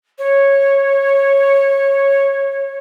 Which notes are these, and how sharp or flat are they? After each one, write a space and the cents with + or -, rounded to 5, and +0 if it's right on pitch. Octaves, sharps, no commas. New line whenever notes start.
C#5 -10